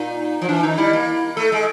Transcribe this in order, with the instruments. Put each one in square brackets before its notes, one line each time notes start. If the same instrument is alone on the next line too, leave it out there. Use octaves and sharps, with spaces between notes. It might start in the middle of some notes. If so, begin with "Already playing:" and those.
Already playing: [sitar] A#2 [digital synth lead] D#4
[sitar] F3
[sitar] E3 [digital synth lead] D4
[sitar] D#3 [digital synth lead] D#4
[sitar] G3 [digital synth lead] E4
[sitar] A#3
[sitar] A3 [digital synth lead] A4
[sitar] G#3